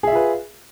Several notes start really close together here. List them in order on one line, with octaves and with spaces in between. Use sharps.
G#4 E5 F4 B4